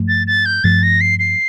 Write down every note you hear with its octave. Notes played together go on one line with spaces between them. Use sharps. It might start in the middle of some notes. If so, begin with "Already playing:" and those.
Already playing: G2 F3 A3
A6
A6
G6
G2 F3 A3 A6
A#6
C7
C7